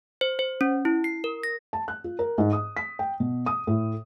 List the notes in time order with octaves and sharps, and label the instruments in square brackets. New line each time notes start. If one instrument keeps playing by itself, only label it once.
[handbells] C5
C5
C#4
E4
C7
A#4
A#6
[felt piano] A5
F#6
F4
A#4
G#2
D#6
B6
G5
B2
D#6
A2